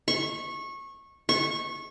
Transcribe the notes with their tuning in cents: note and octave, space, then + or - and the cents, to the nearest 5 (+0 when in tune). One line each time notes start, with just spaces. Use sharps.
C#6 -20
C#6 -20